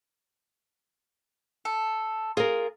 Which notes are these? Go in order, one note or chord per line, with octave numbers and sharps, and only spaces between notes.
A4
F4 G#4 A#4